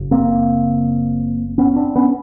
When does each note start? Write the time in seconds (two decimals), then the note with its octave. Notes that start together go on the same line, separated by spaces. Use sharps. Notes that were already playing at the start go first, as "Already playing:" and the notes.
Already playing: F#1 C#3
0.11 A#3 C4
1.58 B3 C#4
1.76 C4 D4
1.96 B3 C#4